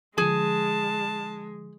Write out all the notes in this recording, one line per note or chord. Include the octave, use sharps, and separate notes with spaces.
D3 F3 G#3 G#4 A5